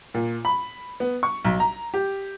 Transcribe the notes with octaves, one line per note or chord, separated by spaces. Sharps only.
A#2
B5
B3
C#6
B1
A#5
G4